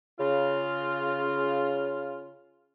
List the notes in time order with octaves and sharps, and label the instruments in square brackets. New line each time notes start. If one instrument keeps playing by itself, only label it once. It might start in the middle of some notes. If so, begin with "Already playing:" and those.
[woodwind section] C#3 F4